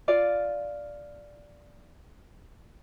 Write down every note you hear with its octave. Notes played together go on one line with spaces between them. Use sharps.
F4 D5 F5